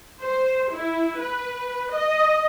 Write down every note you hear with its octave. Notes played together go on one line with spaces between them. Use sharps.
C5
E4
B4
D#5